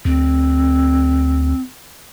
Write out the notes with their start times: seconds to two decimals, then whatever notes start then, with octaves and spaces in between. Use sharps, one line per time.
0.05 D2 C4